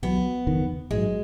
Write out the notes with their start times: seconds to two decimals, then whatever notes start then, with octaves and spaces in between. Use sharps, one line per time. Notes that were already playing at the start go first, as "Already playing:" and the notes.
0.02 B1 B2 F#3 B3
0.47 F#1 E2 D#3
0.90 A#1 G#2 F#3 G#3